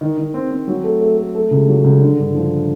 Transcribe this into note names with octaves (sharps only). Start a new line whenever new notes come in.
D#3
D#3
C4
C4
F#3
A3
A3
A3
A3
C#2
F#3
C#2
D3
G2
F3